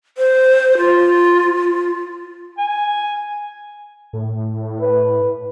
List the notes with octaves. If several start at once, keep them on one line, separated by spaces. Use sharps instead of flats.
C5
F4
G#5
A2
B4